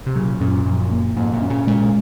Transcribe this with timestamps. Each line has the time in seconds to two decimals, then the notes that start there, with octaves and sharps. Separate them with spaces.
0.06 C3
0.15 A#2 C#3 F#3
0.40 F#2 A#2 C#4
0.66 F#2 A#2 F3
0.91 A#3
1.17 F2 G#2 A#3
1.33 F#2 A#2
1.42 C#4
1.50 A#2 C#3
1.67 A#2 C#3 G#3